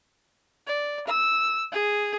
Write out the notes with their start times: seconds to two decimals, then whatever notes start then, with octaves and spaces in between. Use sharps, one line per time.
0.67 D5
1.08 E6
1.72 G#4